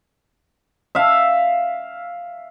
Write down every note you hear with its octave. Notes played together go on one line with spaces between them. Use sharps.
E5 F5